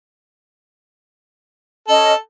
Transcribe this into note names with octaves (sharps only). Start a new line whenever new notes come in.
C#4 A4 D#5